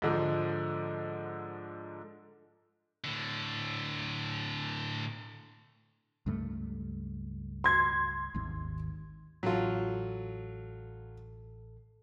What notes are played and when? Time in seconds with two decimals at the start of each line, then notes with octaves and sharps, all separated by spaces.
0.02 G#2 D3 F3
3.04 A2 D3
6.26 C#2 G2 A3
7.64 C6 G#6
8.34 G#1 D#2
9.43 A1 F#3 F4 A4